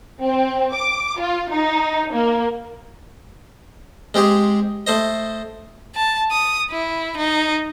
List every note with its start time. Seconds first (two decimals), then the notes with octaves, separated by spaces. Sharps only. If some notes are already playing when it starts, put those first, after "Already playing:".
0.22 C4
0.74 D6
1.20 F4
1.51 D#4
2.14 A#3
4.14 G#3 C4 G4 G#4
4.87 A3 C5 D#5
5.95 A5
6.32 D#6
6.70 E4
7.17 D#4